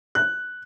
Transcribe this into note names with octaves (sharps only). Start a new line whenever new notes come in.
F#6